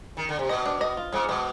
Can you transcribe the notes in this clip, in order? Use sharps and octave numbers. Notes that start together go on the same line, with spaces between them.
D#3
D3
C3
B2 D#5
D4
D#5
F4
G#2 G#3
B2 G#3